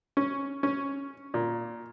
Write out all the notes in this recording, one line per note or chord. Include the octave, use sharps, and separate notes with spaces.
C#4
C#4
A#2